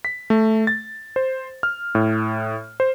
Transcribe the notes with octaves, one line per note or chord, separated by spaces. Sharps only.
B6
A3
A6
C5
F6
A2
C5